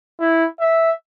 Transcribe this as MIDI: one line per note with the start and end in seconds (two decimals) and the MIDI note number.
0.20 0.46 64
0.60 0.92 76